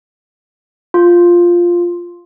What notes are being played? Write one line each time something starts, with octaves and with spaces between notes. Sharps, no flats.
F4